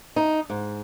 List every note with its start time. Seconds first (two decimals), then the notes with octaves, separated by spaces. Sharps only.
0.16 D#4
0.50 G#2